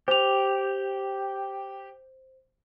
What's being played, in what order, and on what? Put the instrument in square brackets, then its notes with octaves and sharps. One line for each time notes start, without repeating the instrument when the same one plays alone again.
[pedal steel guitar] G4 [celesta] C5 F7